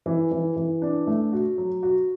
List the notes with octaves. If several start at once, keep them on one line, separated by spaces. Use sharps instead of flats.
E3
E3
E3
D4
A3
F#4
F#3
F#4